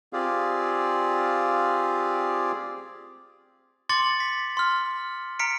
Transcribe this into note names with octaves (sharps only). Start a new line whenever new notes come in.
C4 F4 G4 G#4 D5 F5
C6 D6 A6 C#7 F#7
B6
C6 F6
A#5 F6 B6 C#7 D7